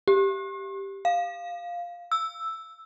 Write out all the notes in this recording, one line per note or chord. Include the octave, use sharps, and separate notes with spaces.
G4
F5
E6